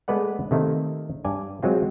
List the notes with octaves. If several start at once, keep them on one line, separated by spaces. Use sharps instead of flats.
G#3 A3 B3 B4 D5 F#5
C3 D#3 A3 A#3
G2 D5 G#5
F#3 G#3 C4 F4